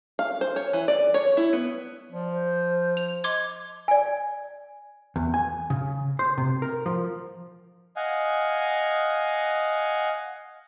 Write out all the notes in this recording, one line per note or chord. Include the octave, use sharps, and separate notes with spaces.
F5
C5
C#5
E3
D5
C#5
E4
B3
F3 D5
C5
F7
D#5 C6 D6 G#6
D5 G#5
E2
G#5
C#3
C5
C3
A#4
F3
D#5 F5 F#5 G#5